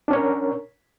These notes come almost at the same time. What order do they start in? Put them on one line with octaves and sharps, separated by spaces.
D4 C#4 C#5 A#4